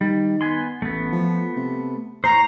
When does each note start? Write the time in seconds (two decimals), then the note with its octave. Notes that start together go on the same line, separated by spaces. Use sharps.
0.01 D#3 G3
0.41 B3 G#5 C6
0.82 A1 A3 B3
1.12 F3
1.56 C3
2.24 A2 C5 C#5 A#5